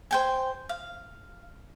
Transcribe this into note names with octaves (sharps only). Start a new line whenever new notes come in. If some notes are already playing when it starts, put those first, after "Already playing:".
C5 G5 G#5
F5